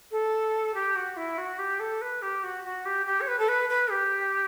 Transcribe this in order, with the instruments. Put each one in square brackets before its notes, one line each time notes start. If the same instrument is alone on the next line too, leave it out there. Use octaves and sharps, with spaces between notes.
[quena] A4
G4
F#4
E4
F#4
G4
A4
B4
G4
F#4
F#4
G4
G4
C#5
B4
A4
B4
B4
G4